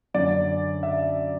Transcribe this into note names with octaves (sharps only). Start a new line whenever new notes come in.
F#2 D3 D5
E5